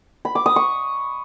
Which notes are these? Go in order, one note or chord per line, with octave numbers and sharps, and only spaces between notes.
B5
D6
D#6
C#6